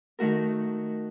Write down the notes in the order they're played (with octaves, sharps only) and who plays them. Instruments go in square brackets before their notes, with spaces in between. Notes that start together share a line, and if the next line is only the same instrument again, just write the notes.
[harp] D#3 A3 F#4 A#4